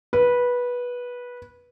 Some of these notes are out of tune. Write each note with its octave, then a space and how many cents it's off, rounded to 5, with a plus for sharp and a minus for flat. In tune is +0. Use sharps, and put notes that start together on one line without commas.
B4 -15